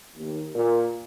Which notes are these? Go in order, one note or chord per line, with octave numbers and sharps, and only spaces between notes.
D#2
A#2